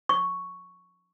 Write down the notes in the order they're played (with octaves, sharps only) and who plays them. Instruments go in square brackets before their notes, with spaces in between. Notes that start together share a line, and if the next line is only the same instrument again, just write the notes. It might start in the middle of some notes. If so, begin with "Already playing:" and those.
[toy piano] C#6